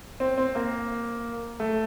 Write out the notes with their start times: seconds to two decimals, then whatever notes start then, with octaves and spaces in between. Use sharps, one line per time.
0.20 C4
0.38 C4
0.55 A#3
1.60 A3